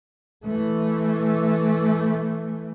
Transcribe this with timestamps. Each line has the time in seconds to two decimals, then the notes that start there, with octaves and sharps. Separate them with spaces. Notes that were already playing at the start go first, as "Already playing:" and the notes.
0.45 E3 A3